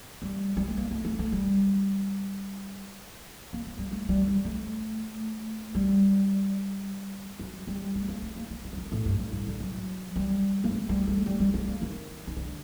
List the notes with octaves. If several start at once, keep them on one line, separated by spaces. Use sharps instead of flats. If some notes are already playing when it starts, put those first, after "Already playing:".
G3
G3
A3
A#3
A3
A3
A3
G3
A#3
A3
G3
A3
G3
G3
A3
G3
F#3
G3
A3
A#3
A3
A#3
A#3
G3
F#3
D#3
A2
G2
G2
A2
D3
F#3
G3
A#3
A3
G3
A3
G3
G3
A3
A#3
D#3
D#3
D3